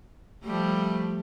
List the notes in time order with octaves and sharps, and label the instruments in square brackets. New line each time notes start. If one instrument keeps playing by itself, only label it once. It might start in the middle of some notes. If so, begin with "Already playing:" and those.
[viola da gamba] F3 G3 A3